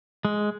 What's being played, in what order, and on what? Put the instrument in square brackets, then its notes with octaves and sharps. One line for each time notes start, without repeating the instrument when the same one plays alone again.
[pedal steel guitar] G#3